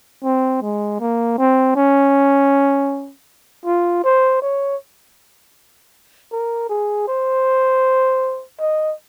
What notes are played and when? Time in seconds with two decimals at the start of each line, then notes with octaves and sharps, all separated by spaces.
0.24 C4
0.62 G#3
1.00 A#3
1.38 C4
1.76 C#4
3.65 F4
4.04 C5
4.42 C#5
6.32 A#4
6.69 G#4
7.08 C5
8.59 D#5